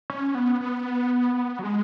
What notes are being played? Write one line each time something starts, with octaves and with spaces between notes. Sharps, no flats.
C#4
B3
B3
F#3
G#3